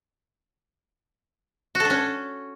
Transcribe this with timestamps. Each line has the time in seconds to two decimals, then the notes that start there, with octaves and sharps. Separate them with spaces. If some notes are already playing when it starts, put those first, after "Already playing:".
1.75 F#4
1.80 A4
1.85 D4
1.90 C#4